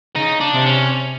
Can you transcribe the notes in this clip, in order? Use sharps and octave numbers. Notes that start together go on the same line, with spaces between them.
C#3 D#4
D4
C3
C#4